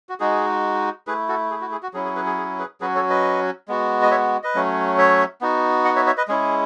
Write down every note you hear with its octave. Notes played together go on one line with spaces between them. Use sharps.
F#4
G#3 D#4 F#4 G#4
A3 E4 G#4 B4
F#4 A4
G#4
F#4
G#4
F#4
F#3 C#4 E4 G#4
G#4
G#4 B4
G#4
G#4
G#4 B4
F#3 C#4 F#4 G#4 B4
A4 C#5
B4 D#5
G#3 B3 F#4
D#5
C#5 E5
B4 D#5
F#3 A3 C#4
C#5 E5
B3 D#4 F#4
D#5 F#5
C#5 E5
C#5 E5
B4 D#5
G#3 C#4 E4 G#4